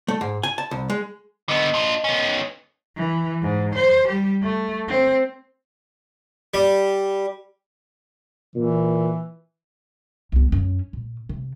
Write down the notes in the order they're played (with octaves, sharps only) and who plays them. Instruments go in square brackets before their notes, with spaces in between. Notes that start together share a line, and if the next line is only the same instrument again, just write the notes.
[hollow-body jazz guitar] A3
G#2
G#5
A5
C2
G#3
[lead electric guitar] D3 B3 [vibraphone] D#5
[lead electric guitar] D4 F4
B3 C#4
[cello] E3
G#2
C5
G3 G4
A3
C4
[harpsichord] G3
[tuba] A#2 [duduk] E3
[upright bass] C2 B3
F#2 C#4
A#2
C3